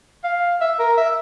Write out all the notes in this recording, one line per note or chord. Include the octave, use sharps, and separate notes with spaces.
F5
E5
A#4
E5